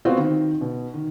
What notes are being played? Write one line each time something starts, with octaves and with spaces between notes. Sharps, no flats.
B3 C4 F4 F#4
D#3
B2
D#3